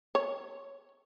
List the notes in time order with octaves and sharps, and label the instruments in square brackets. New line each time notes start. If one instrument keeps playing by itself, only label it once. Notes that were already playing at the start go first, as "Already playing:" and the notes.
[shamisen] C#5